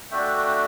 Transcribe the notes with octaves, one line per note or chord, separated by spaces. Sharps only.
A3 D4 F#4 E5 G5